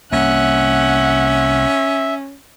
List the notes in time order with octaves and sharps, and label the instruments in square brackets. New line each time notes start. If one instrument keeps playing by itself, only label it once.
[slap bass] C2 A#3 [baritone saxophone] C#4 [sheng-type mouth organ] E5 [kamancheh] F#5